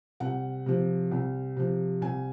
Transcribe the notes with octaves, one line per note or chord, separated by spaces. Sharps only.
C2 F#5
C3 F3
C2
C3 F3
C2 G#5